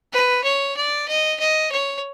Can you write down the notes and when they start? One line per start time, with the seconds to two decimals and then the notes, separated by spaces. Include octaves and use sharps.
0.13 B4
0.43 C#5
0.76 D5
1.08 D#5
1.40 D#5
1.72 C#5